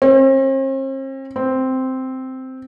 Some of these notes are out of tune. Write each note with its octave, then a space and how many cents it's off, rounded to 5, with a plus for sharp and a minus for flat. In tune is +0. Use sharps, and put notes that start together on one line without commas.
C4 +45
C4 -5